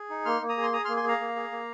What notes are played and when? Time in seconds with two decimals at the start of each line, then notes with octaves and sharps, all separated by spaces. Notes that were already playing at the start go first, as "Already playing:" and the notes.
Already playing: G#4
0.10 D#4
0.25 A#3 C6 F6
0.42 A#3
0.49 A#5 D#6
0.57 G#4
0.63 C6
0.73 G#4 A#5 D#6
0.85 C6 F6
0.88 A#3
0.97 G#5 C6
1.04 G#4 F5 A#5
1.20 A#3
1.36 G#4
1.52 A#3